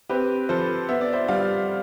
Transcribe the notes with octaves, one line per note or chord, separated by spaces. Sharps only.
C4 G4 B4
F3 A4 C5
B3 E5
D5
C5 E5
G3 D5 F5